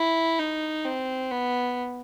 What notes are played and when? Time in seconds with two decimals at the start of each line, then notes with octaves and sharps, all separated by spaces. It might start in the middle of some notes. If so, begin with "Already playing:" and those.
Already playing: E4
0.39 D#4
0.85 C4
1.31 B3